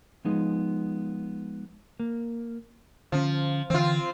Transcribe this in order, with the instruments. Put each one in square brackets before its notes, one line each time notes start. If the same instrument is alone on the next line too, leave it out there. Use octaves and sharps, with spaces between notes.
[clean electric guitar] F3 G#3 B3 D#4
A#3
[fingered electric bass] D3 C#4 [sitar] F3
[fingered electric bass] D3 E3 [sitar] C4 F4